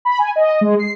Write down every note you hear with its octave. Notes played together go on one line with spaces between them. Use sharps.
B5
G#5
D#5
G#3
C7